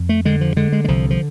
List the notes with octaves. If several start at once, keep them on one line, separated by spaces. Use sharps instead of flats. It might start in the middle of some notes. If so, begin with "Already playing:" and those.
Already playing: F2
A3
D3 G#3
F3
D3 G#3
G#3
G#3
C2 F3
F3